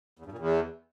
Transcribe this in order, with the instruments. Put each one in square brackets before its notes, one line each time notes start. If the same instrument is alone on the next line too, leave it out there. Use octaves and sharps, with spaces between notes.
[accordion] E2
G2
A#2
E2